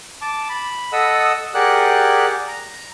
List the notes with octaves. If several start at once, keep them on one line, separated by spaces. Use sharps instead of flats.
A5 D6
B5
A4 D#5 F#5 D#6 E6
G4 G#4 A#4 D5 F#5 F#6
A#5